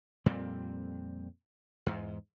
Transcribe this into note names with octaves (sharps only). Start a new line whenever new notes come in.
F2 A#2 G3 C4
E2 G#2